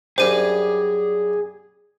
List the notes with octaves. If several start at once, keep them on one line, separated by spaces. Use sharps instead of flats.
F#2 G3 D4 G#4 C5 D#7